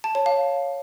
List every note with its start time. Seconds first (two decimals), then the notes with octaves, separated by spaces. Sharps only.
0.04 A5
0.15 C#5
0.26 F5